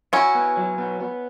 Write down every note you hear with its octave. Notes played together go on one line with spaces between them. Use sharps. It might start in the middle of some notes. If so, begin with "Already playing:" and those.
C#4 E4 F#4
B3
F#3
B3
B3